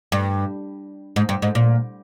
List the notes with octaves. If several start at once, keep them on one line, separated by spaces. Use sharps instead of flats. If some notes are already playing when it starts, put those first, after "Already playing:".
G2
G#2
G2
G#2
A#2